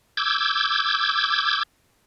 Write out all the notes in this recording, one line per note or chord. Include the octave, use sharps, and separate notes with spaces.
D6 E6 G6 G#6